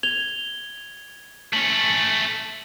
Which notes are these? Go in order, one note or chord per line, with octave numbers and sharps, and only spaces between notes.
G#6 F7 G7
A3 C#4 F#7